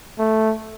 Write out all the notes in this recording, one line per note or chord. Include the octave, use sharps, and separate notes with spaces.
A3